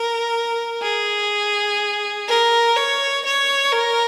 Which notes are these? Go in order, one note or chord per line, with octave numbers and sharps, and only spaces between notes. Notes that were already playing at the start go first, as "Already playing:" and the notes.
Already playing: A#4
G#4
A#4
C#5
C#5
A#4